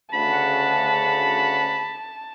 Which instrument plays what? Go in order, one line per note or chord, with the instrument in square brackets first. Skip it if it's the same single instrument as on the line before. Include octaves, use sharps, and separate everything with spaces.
[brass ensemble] D2 C#3 F#5 [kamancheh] A5 [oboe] B5